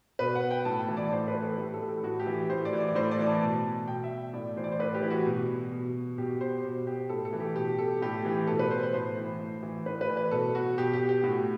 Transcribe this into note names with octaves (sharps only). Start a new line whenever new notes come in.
B2 B4
F#5
G5
A2 A5
A5
E3
D5
A2 C5
B4
E3
A4
A2 G4
A4
E3
A4
A2 F#4
G4
E3
A2 C5
D5
E3
D5
A2 C5
D5
E3
A5
B2
B2 G5
E5
A2 D5
E3 C5
D5
C5
A2 B4
G4
E3
F#4
B2
B2
B2 G4
C5
B2 C5
G4
A2 A4
A4
E3
G4
B2 G4
A4
A2 G4
E3
B2 A4
B4
C5
C5
A2 C5
E3
A2
E3
A2 B4
B4
E3
B4
B2 A4
F#4
B2 G4
G4
G4
A2 F#4